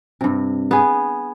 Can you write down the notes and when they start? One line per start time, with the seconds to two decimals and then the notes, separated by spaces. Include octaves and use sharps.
0.21 G2 C3
0.71 B3 G#4